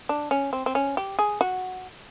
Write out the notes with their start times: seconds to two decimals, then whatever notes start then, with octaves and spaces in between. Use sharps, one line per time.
0.09 D4
0.31 C#4
0.53 C4
0.66 C4
0.75 C#4
0.97 G4
1.19 G#4
1.41 F#4